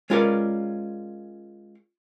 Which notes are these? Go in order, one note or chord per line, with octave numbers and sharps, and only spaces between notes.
G#3 C#4 F4 A#4 B4 D5